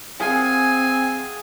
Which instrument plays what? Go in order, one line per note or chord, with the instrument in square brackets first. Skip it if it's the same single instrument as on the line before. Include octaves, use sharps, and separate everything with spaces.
[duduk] C4 [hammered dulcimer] G#4 F5 F#5 [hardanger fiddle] G#5